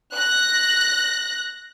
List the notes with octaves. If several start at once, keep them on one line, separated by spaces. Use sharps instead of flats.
F#6 A#6